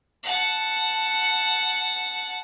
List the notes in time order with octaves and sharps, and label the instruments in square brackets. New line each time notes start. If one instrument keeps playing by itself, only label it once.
[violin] F#5 A5